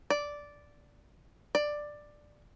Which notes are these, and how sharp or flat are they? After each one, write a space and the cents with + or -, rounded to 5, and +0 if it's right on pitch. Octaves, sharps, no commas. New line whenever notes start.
D5 -5
D5 +10